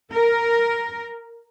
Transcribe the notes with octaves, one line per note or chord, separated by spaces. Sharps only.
A#4